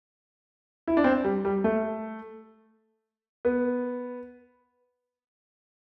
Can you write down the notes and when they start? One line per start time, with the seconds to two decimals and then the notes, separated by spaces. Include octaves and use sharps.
0.88 E4
0.97 D4
1.04 C4
1.24 G3
1.45 G3
1.64 A3
3.45 B3